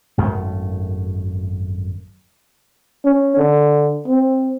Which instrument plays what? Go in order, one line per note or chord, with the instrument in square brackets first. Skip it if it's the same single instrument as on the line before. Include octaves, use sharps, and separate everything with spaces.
[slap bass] G#1 F#2 A3
[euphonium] C#4
D3
C4